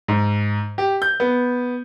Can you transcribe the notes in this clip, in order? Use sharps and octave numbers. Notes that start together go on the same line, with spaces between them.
G#2
G4
G6
B3